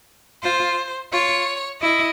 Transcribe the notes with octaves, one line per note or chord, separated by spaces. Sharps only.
F4 C5
F4 C#5
E4 D#5